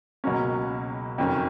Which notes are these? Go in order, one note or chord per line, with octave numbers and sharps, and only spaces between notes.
C#2 B2 F#3 A#3 C#4
F#1 F2 D#3 F#3 C#4